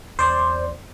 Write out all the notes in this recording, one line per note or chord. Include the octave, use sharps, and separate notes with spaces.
E2 C5 D5